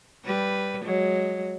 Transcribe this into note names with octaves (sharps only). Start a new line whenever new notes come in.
G3 B4
F#3 G#3